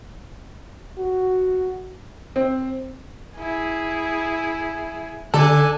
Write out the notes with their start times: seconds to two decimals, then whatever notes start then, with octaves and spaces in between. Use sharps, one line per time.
0.98 F#4
2.36 C4
3.38 E4 G#4
5.34 D3 A4 D5 G#5 F#6